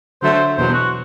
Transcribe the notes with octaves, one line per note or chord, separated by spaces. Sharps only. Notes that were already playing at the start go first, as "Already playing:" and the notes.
D3 F#3 A3 C5
C5
E2 B2 F#3 C5
F#4